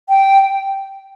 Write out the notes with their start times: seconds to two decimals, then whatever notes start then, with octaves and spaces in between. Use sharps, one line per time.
0.09 G5